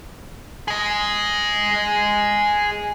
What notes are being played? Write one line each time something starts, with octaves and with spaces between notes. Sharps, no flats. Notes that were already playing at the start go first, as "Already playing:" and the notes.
G#4 D#5